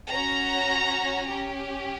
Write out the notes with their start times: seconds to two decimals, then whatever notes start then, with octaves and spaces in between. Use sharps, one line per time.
0.11 C#4 F#4 A#5
1.28 C#4 G4